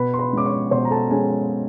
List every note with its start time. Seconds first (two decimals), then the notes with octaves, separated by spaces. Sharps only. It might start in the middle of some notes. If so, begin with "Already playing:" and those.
Already playing: B2 B4 B5
0.14 C6
0.19 B4 B5
0.33 G#3 C#4 D6
0.46 C#5 C#6
0.71 B2 C5 C6
0.85 A#5
0.91 A4 A5
1.10 G#3 C#4 G#4 G#5